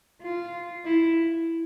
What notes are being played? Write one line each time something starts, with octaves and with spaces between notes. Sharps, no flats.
F4
E4